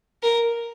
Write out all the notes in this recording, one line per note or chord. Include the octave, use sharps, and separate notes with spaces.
A#4